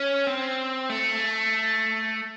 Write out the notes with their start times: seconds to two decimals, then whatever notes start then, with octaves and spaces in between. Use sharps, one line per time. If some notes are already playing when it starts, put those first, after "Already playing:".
Already playing: C#4
0.27 C4
0.90 A3